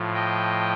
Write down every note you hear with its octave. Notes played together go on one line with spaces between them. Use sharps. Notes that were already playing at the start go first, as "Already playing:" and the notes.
Already playing: A2 F3
D#5 G5